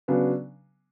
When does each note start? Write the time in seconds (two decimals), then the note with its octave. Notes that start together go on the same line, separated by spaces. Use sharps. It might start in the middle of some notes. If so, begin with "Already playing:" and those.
0.08 C#3 F#3 B3 D4